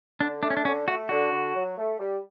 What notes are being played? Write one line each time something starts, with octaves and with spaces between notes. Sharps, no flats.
D3 D4
A3 D4
C#4
D4
D3 C#4
A3 F#4
D3 F#4
D3
F#3
A3
G3